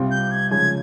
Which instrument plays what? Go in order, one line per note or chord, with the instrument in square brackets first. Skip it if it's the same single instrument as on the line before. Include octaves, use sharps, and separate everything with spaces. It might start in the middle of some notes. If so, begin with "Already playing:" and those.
Already playing: [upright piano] C2 C3 G3 C4 F4
[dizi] G6
G#6
[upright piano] C#3 F3 G#3 [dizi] G#6